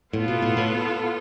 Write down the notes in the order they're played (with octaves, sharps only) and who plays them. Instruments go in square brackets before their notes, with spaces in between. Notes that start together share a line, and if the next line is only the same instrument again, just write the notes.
[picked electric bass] A2 [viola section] B3 F4 A4
[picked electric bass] B2
A2
A2